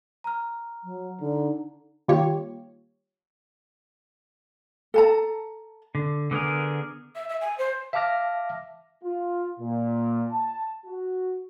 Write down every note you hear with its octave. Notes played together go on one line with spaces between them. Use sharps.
A#5 F6
F#3
D3 D#4
D#3 G3 A#3 F4 G4 C#5
A4 A5 A#5
D3
D3 B3 G#4 A#4
E5
E5
G#5
C5
E5 F5 A5 D6 F6 A#6
F4
A#2
A5
F#4